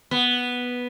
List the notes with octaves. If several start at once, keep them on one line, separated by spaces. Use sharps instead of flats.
B3